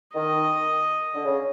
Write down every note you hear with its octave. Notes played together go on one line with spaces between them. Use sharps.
D#3 D#5
D3
C#3